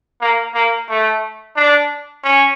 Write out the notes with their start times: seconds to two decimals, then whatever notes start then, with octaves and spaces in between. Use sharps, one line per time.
0.21 A#3
0.54 A#3
0.89 A3
1.57 D4
2.24 C#4